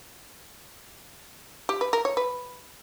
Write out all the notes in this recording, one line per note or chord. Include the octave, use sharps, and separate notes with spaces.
G4
B4
A#4
C#5
B4